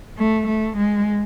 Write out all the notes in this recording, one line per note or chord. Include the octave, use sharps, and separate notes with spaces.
A3
A3
G#3